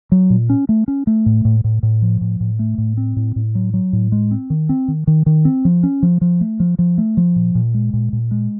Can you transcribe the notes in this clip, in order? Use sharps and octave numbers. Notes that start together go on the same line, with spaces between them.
F#3
A#2
C#4
A3
C#4
A3
A2
A2
A2
A2
F3
A2
A2
A3
A2
C4
A2
A2
F#3
F#3
A2
G#3
C4
D#3
C4
D#3
D#3
D#3
C4
F3
C#4
F3
F3
A3
F3
F3
A3
F3
A#2
A#2
G#3
A#2
A#2
G#3